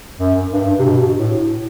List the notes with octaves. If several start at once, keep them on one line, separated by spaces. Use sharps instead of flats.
F#2
G2
C3
B2
A2